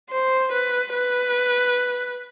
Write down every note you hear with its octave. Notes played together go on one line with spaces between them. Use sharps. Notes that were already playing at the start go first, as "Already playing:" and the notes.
C5
B4
B4